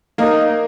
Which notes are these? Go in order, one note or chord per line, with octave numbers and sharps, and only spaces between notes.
A#3 D#4 A#4